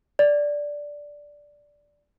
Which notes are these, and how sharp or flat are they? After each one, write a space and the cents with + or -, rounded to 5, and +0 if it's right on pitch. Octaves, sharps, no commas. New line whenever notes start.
D5 -5